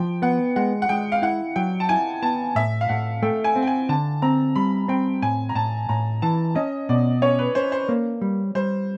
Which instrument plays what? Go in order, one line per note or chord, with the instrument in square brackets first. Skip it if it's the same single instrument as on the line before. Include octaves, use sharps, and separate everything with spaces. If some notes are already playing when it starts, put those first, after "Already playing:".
Already playing: [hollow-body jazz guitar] F3 [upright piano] G5
[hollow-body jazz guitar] B3 [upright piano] F#5
[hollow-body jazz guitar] G#3 [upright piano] F#5
[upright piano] F#5
[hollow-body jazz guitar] G#3 [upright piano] G5
[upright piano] F5
[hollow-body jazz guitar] E4 [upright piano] F#5
[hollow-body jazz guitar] F#3 [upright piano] G5
[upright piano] A5
[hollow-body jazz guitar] E4 [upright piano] G#5
[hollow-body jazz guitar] B3 [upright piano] A5
[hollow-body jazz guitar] A2 [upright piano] E5
[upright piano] F5
[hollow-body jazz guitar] A2 [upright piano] F#5
[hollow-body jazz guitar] A3 [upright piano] G5
[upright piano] G#5
[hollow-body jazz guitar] C4
[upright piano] G5
G#5
[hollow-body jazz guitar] D3 [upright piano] A5
[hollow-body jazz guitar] C4 [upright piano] A#5
[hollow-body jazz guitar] G3 [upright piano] B5
[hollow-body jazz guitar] C4 [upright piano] G5
[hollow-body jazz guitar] A2 [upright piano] G#5
[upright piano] A#5
[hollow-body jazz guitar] A2 [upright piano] A5
[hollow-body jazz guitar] A2 [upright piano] A#5
[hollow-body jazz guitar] E3 [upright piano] A5
[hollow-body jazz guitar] C#4 [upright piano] D#5
[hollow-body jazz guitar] B2 [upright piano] D5
[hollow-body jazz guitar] C#4 [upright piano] C#5
[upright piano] B4
[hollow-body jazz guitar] C#4 [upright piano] C5
[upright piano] C5
[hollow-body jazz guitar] A#3
G3
[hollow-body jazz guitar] G3 [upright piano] C5